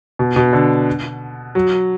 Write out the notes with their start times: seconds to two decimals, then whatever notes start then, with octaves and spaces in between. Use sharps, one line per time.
0.19 B2
0.36 B2
0.53 D3
1.55 F#3